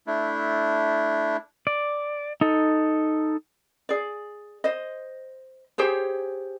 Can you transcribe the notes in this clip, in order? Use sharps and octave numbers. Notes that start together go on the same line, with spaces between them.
A3 D4 E4
D5
D#4 A4
G#4 D5
C5 D#5
G4 G#4 C5 C#5